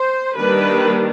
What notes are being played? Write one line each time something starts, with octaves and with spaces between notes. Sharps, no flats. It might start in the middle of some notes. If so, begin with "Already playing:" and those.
Already playing: C5
D#3 G3 A#3 D4 B4